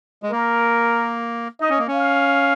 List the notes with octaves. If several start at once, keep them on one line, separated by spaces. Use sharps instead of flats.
G#3
A#3 A#4
D#4 D#5
C#4
A#3
C#4
F5